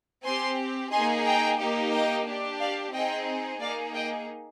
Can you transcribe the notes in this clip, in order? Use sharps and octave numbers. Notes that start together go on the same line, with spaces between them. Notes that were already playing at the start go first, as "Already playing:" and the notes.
C4 G4 G#5 C6
A#3 D#4 G#4 G#5 C6
G5 A#5
A#3 D#4 G4
D#5 G5
D4 G4
D5 F5
C4 D#4 G#4 D#5 G5
A#3 D#4 G#4 D5 F5
D#5 G5